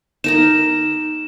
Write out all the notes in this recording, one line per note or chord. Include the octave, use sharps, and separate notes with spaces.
D#4 A#4 A#5 E7